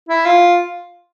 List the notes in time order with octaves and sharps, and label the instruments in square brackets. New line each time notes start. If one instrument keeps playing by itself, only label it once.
[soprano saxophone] E4
F4